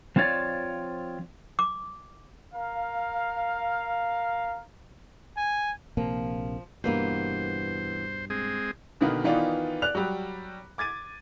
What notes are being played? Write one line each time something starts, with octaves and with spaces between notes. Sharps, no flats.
F3 C4 F4 C#5 D5
D6
A#4 F5
G#5
A#1 C3 F3 A#3
G2 B2 E3 A#3 B3 C5
G#3 C4 G#4
B2 D3 D#3 A#3 B3
D#3 E3 B3 D#4 F4 D5
D5 F#6 F7
F#3 G3
D6 G#6 A6 D#7